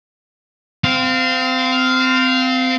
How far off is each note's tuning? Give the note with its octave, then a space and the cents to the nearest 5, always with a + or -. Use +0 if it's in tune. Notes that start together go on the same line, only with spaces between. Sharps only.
C4 -25 F5 +0